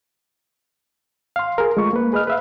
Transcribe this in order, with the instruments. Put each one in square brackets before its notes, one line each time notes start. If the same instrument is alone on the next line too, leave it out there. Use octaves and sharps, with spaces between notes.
[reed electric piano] F5 C6
G#4 A#4
G#3 A3 F4 C#6
A#3 B4
G#4 B4 D#5 F6
B4 E5 F5